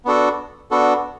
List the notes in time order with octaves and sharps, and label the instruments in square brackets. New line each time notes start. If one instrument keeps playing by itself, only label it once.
[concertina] B3 D4 F#4 A4
B3 D4 F#4 A4